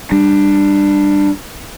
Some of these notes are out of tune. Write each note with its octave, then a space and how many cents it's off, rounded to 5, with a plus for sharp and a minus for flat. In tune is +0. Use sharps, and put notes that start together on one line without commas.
G3 +10 D4 +15